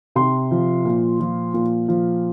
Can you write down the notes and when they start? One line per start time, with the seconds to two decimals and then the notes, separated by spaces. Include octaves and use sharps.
0.15 C3 C6
0.51 F3
0.85 A#2
1.20 F3
1.54 A#2
1.88 F3